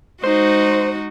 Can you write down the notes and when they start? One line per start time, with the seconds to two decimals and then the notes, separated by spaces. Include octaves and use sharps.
0.24 G#3 D#4 F#4 C5